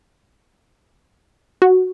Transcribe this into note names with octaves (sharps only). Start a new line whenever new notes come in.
F#4